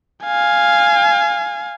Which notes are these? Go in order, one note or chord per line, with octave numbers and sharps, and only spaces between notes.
F5 G#5